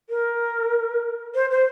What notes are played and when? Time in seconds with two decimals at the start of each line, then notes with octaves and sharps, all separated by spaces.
0.10 A#4
1.35 C5
1.51 C5